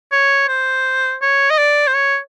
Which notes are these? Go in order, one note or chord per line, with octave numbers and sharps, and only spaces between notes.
C#5
C5
C#5
D#5
D5
C5
C#5